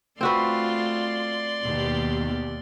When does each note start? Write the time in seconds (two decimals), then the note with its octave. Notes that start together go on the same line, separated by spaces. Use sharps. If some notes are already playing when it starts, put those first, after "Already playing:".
0.21 A3 C4 F4 F#4 B4 D5 C6
1.64 D#2 B2 B3 G4